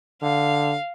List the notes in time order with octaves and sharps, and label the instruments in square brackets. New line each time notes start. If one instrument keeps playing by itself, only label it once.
[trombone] D3 [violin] F5